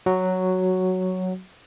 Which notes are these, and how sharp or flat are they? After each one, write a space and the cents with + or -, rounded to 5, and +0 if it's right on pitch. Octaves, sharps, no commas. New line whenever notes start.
F#3 +0 F#4 +5